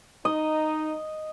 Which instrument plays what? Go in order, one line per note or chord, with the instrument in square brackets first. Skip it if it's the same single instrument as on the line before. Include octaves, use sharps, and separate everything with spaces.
[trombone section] D#4 [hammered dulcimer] D#5